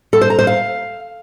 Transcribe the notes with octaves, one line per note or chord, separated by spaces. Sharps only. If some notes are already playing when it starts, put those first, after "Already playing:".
A4
C5
A#5
C5
F5